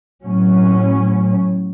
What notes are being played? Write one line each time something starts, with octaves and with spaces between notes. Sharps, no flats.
A2 F#3 C#4